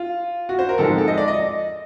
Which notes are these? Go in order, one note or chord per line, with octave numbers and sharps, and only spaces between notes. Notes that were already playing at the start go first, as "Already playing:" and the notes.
Already playing: F4
F#4
C5
A#4
G#2 F3 G#3 C4 A4
A4
D#5
D5
D#5